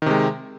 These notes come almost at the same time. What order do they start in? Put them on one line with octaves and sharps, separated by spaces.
D#3 C3 G#3